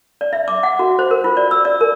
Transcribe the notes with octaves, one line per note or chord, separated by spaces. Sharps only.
D5
E5
D6
F#5
F#4
C5
A#4
F4
D5
E6
D5
A#4